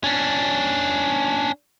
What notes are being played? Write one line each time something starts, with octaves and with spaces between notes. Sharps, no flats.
C#4 D4